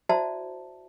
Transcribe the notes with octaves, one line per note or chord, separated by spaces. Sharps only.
E4 F#4 C5 D5 E5 A5